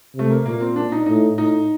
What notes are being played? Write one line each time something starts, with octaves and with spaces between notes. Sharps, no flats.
C3 A3
A#3
A#2 A#3
C4
D4
D#4
A2 D#4
A2 D#4